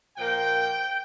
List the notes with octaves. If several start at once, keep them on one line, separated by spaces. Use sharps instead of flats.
A#2 F3 A#3 G5